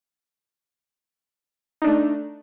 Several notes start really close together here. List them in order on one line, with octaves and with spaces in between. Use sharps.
D#4 D4 A3